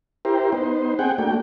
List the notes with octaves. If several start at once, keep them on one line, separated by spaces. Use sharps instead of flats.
E4 G4 A#4 C5
B3 D#4 C5
C4 G#4 F#5 G5
A3 A#3 D4 F#4 G5